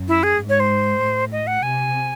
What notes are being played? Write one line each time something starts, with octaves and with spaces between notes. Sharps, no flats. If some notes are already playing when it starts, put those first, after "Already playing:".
Already playing: F#2
E4
G#4
G#2
C#5
C5
A2
D#5
F#5
C3 G#5